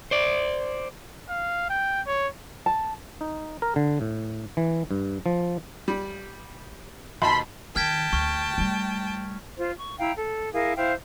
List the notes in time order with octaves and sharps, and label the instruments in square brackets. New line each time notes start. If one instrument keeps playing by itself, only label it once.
[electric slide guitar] C5 D5
[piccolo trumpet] F5
G5
C#5
[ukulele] A5
[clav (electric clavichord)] D#4
A#4
D3
A2
E3
G2
F3
[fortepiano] G3
[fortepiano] D#2 B2 A5 [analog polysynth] B5 C6 B6
[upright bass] D#3 [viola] G5 A5 [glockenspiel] F6 G#6 B6
[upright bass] D2 [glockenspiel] C#6 F6
[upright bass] G3 A3
[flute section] F4 C5
C#6
E4 F5 G5 A#5
A4
E4 G#4 A#4 F5
E4 C5 F5 G5